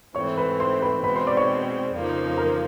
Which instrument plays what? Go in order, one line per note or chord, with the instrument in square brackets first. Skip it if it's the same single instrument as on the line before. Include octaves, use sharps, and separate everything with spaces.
[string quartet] G#2 E3 A3 C4 [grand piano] C#5 C#6
[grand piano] B4 B5
C5 C6
B4 B5
[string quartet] B2 G#3 C4 [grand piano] B4 B5
[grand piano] C5 C6
D5 D6
C#5 C#6
[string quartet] F2 C#3 F3 A#3 D#4
[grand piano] A#4 A#5